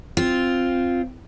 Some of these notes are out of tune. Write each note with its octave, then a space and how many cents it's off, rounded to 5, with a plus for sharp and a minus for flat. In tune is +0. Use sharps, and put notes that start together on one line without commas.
C4 +0 F4 +0